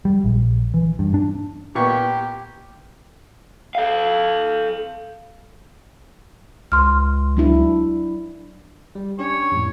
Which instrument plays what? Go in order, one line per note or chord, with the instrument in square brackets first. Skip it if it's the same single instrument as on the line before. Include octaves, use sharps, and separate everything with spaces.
[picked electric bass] G3
A#1
E3
G2
D4
[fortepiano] A#2 B3 C#6 [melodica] G4
[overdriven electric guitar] A4 F5
[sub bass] C#2 [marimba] C6 F6
[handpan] F#3 D4 E4
[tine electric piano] G3
[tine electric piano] C#4 D4 G4 [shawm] C#5
[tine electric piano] F2 A2